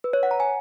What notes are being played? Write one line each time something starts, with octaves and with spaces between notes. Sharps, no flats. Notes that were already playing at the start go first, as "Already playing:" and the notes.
B4
C#5
F#5
A#5
G#5